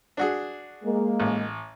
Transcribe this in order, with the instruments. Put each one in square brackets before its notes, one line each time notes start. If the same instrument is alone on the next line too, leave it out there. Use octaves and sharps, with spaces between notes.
[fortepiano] D4 F#4 G#4
[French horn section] G#3 A#3
[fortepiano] A1